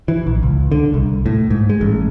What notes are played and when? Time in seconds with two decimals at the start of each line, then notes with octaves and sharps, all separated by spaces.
0.08 E3
0.27 A#1
0.43 C#2
0.72 D3
0.94 C2
1.26 A2
1.50 G#2
1.70 G#3
1.81 A1